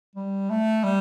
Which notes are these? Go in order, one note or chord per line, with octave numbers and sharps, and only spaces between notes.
G3
A3
G3